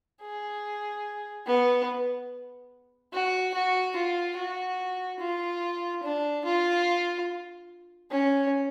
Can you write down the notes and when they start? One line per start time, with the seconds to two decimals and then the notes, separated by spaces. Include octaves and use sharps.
0.22 G#4
1.46 B3
3.13 F#4
3.55 F#4
3.96 F4
4.37 F#4
5.20 F4
6.03 D4
6.45 F4
8.11 C#4